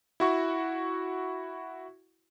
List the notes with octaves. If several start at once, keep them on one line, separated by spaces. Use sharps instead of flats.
E4 F#4 C#6